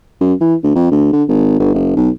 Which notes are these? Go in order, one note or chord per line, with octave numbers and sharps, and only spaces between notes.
F#2
E3
D2
F2
D2
D3
G#1
G1
F#1
B1